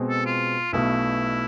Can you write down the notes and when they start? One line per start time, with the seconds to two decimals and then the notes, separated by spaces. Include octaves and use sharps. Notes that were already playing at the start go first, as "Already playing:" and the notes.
Already playing: B2 G#3 C4
0.09 A4
0.26 F4
0.73 B1 B2 A3 E4